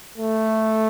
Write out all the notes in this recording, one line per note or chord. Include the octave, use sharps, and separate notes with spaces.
A3